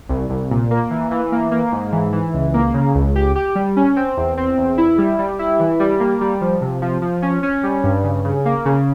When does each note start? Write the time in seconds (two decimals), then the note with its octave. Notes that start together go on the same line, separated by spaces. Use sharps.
0.09 C2
0.30 C2
0.51 A#2
0.71 A#3
0.90 E3
1.11 E3
1.32 A#3
1.51 A#3
1.72 G#2
1.92 E3
2.12 E3
2.34 C#2
2.54 A#3
2.74 C#3
2.95 C#2
3.16 G4
3.36 G4
3.55 G3
3.76 C#4
3.96 C4
4.17 E2
4.37 C4
4.58 E2
4.78 E4
4.98 G3
5.19 G3
5.39 E4
5.60 E3
5.80 G3
6.00 A#3
6.21 G3
6.41 F3
6.61 C3
6.82 F3
7.02 F3
7.22 C#4
7.43 C#4
7.63 G3
7.84 G2
8.04 C#3
8.25 C#3
8.45 A#3
8.65 C#3